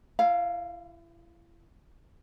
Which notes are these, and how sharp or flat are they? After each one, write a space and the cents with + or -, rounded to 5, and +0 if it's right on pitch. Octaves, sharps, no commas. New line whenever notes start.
E4 +35 F5 +0 A#5 -15